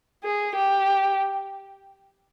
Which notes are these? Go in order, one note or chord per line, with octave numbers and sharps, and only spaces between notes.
G#4
G4